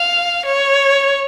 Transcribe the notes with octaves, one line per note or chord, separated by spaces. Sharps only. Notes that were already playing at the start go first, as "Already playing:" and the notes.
Already playing: F5
C#5